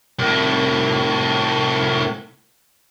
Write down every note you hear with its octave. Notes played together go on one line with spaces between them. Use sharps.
C2 A2